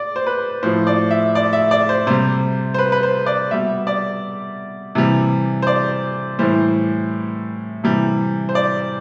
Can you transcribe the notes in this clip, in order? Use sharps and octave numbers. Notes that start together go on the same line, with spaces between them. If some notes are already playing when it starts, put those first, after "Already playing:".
Already playing: D5
C5
B4
A2 F3 C5
D5
E5
D5
E5
D5
C5
C3 G3 C5
C5
B4
B4
C5
D5
B2 G3 E5
D5
C3 E3 G3
C5
D5
A2 E3 G3 C5
C3 E3 G3
C5
D5